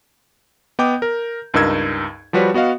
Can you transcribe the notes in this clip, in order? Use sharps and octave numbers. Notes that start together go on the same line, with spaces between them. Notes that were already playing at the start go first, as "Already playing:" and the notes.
B3 D#5 G5 D6 G6
A#4
C#2 G2 D#4 A#4 E6 G#6
F3 G3 F#4 B4 C#5
B3 F#4 D#5 F5